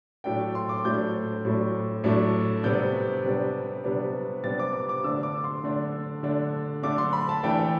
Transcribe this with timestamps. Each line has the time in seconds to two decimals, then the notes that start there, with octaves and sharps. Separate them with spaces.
0.24 A2 F#3 A3 D4 G5
0.55 C6
0.69 D6
0.85 A2 F#3 A3 D4 G6
1.45 A2 F#3 A3 D4
2.04 A2 F#3 A3 D4
2.64 C3 G3 B3 D4 G6
3.24 C3 G3 B3 D4
3.84 C3 G3 B3 D4
4.44 C3 G3 B3 D4 A6
4.59 D6
4.73 D6
4.89 D6
5.04 D3 A3 D4 E6
5.23 D6
5.44 C6
5.64 D3 A3 D4
6.23 D3 A3 D4
6.83 D3 A3 D4 D6
6.98 C6
7.13 B5
7.29 A5
7.43 E3 A3 D4 G5
7.59 G5